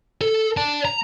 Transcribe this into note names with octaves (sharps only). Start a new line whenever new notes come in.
A4
D5 A5
A#5